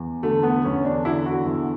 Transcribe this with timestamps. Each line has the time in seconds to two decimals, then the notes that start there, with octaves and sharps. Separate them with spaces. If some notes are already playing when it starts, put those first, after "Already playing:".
Already playing: E2
0.23 D3 A3
0.43 B3
0.64 E2 C#4
0.85 D4
1.05 D3 E4
1.26 F#4
1.46 E2